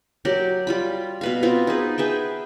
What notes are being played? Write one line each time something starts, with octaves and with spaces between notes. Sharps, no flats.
F#3 G4 A#4 D5
G3 F4 B5
B2 B4 F5
B3 C4 F4
D#4 G#4 B4
G#4 B4 E5 G5